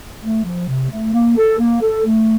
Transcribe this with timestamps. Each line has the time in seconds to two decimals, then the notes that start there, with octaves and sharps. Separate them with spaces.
0.21 A3
0.44 F3
0.67 C3
0.90 A3
1.13 A#3
1.36 A4
1.59 A#3
1.82 A4
2.05 A3